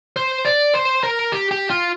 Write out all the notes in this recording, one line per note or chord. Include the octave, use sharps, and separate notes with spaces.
C5
D5
C5
A#4
G4
G4
F4